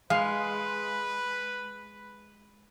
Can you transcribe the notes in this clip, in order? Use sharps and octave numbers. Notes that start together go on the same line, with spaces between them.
G#3 B4 F5